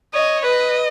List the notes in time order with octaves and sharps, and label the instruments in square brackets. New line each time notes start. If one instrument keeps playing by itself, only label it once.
[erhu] C#5 [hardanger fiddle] D#5
[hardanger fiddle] B4 [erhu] D#5